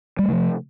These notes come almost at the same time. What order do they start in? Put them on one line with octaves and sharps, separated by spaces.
G3 A3 C3 F3